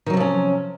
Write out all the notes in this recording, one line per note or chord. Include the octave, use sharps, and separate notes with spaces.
C3 D#3 F3 F#3 C#4